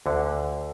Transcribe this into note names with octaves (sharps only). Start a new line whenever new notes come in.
D2 D3